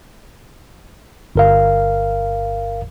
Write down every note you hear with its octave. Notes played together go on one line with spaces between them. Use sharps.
G1 A#4 F5